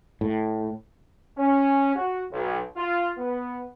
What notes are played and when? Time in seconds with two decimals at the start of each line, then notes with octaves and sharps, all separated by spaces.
0.21 A2
1.38 C#4
1.95 F#4
2.31 B1
2.76 F4
3.18 B3